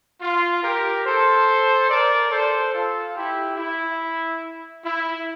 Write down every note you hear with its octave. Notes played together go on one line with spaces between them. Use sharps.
F4
G4 A#4
A4 C5
A#4 D5
A4 C5
F4 A4
E4 G4
E4
E4